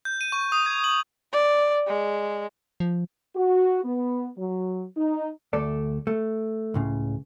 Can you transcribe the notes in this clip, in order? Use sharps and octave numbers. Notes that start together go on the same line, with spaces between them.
G6
D#7
C#6
D#6
G#6
F#7
D5
G#3
F3
F#4
B3
F#3
D#4
D2 A3 A4 D5
A3
C#2 A2 C#3